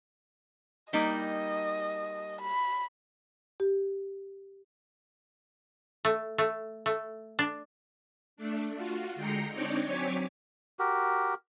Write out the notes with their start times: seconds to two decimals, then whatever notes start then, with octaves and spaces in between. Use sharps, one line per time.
0.93 G3 A#3 D#4 D#5
2.41 B5
3.60 G4
6.05 A3
6.38 A3
6.86 A3
7.39 D4
8.37 A3 D4
8.76 F4 F#4
9.16 D3 G#3 G5 A#5 C7 C#7
9.52 C4 D4 D#4 C#5 D5 G5
9.86 F#3 C4 C#5 G#5 D6 B6
10.79 F#4 G4 A#4